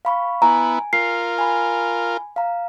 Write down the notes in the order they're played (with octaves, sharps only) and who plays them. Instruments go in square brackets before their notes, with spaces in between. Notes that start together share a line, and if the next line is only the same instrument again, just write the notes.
[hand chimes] F5 B5 C#6
[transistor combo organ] B3 E4 [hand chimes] G#5 [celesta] A#5
[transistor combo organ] F4 A#4 [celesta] C7
[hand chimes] G#5 B5
F5 A#5